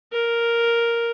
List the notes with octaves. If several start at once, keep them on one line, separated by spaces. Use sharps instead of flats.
A#4